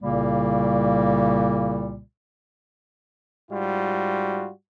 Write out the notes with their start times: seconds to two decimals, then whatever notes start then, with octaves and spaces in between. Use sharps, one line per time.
0.02 C2 A#2 C#3 G3 A#3
3.51 G#2 G3 F4 F#4